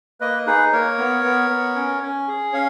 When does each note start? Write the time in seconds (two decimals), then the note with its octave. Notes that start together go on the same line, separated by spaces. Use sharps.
0.20 A#3 B4 D#5
0.46 D#4 G#4 B4
0.73 A#3 A#4 C#5
0.98 B3
1.24 B3
1.50 B3
1.76 C#4
2.02 C#4
2.28 G#4
2.53 C#4 C#5 F5